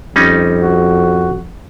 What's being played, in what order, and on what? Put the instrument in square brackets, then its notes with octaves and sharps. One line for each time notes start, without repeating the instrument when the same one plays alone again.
[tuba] F2 [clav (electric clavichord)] G3 C#4 D#4
[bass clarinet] F#4